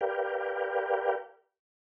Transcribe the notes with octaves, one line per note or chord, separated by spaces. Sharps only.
G4 A#4 B4 D5 F5 G5